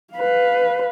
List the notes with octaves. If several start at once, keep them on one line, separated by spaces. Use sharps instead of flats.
B4 F5